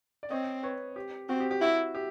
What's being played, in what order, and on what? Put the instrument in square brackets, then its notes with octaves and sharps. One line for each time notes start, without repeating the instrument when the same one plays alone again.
[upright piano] D5
[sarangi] C4 [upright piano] C#5 D#5
[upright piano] B4 C#5
G4
[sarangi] C4 [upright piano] F#4
[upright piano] G4
G4
[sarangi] E4 [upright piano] F#4
[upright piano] G4